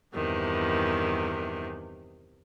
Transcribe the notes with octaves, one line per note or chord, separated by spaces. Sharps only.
E2 G2 C3 D#3